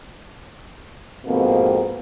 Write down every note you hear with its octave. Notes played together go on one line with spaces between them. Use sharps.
F2 G#2 B2 A#3 C4